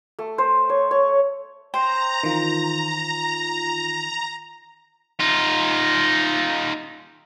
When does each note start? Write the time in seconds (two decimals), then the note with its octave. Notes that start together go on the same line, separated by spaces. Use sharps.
0.19 A3
0.38 C5
0.70 C#5
0.91 C#5
1.74 C5 G5 A#5 C6
2.23 D#3 E3 F4
5.20 D#4 F4